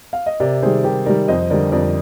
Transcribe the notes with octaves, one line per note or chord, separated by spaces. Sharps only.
F5
D#5
C3 A#4 D5
D#3 G3 G#4 C5
C3 G4 A#4
D#3 G3 A#4 D5
F2 C5 D#5
D3 G3 A#4 D5
F2 A#4 D5